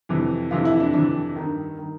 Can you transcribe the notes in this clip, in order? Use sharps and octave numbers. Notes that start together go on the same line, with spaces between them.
F2 C3 E3
F2 C3 E3 F4
E4
D4
F2 C3 E3 D4
D#3
G2
D#3